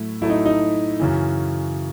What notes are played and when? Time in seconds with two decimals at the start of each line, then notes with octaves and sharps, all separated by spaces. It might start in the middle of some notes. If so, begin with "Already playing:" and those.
Already playing: A2 F#3 A3 E4
0.21 A2 F#3 A3 E4
0.30 D#4
0.45 D#4
1.00 F#2 C#3 E3